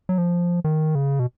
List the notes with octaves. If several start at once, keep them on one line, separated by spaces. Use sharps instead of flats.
F#3
F3
D#3
C#3
B2